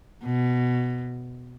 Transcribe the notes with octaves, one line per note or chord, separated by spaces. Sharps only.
B2